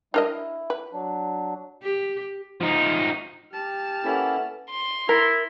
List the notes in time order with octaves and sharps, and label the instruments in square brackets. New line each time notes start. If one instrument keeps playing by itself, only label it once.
[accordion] G3 G#3 E4 [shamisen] D4 A#4 D#5
[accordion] E4
[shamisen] B4
[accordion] F#3 D4
[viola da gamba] G4
[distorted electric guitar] F3 D#4
[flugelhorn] G4 [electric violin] A5 F6
[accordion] A#3 C#4 E4 [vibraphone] A4 B4 F#5
[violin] C6
[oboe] E4 [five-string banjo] A#4